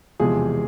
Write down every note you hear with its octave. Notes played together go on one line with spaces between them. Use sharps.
E1 E2 C3 F3 G#3 G#4